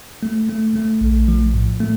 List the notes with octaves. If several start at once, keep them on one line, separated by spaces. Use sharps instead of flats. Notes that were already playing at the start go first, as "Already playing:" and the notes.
A3
A3
A3
A#1
F3
A2
A3